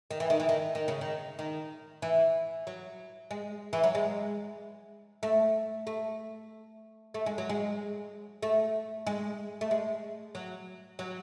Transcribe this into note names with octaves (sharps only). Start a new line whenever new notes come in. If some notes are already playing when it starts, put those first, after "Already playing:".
D#3
E3
D#3
E3
D#3
D#3
C#3
D#3
D#3
E3
F#3
G#3
E3
F#3
G#3
A3
A3
A3
G#3
F#3
G#3
A3
G#3
A3
G#3
F#3
F#3